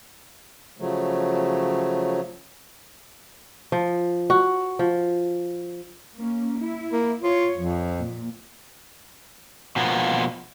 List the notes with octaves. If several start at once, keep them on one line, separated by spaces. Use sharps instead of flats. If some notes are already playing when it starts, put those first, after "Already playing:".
C#3 F3 F#3 A3
F3
F#4
F3
A#3 C#4
E4
A#3
F4 C#5
F2 F3
A#2
B2 F3 A#3 B3